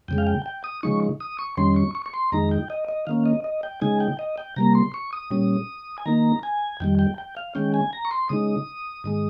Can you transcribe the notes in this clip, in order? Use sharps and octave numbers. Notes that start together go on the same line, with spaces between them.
F2 C#3 G#3 G5
F5
G5
G5
D#6
C#3 F3 G#3 D#4 C#6
D#6
C#6
F2 D#3 G3 C#4 C6
C#6
C#6
C#6
C6
F2 D#3 G#3 D#4 A#5
G5
D#5
D#5
D#3 A#3 C#4 F5
D#5
D#5
G5
C#3 G#3 D#4 G#5
G5
D#5
G5
C3 G3 A#3 A#5
C6
C#6
D#6
A#2 G3 C#4
G#5
D#3 A#3 D#4 A#5
G#5
F2 D#3 G3 G5
G5
G5
F5
D#3 G#3 C#4 G5
G#5
A#5
C#6
C6
C#3 G#3 D#4 D#6
G#2 D#3 G#3